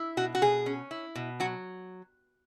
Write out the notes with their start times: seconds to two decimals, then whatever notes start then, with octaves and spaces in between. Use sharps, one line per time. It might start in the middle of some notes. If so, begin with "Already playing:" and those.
Already playing: E4
0.17 B2 F#4
0.35 F#4
0.42 B2 G#4
0.66 C#4
0.91 E4
1.15 B2
1.40 F#3 F#4